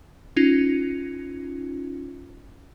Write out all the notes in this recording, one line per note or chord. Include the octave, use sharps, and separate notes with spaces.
C#4 D#4 F4